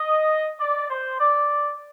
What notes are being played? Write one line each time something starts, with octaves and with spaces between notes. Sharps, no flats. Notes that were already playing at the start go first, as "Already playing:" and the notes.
Already playing: D#5
D5
C5
D5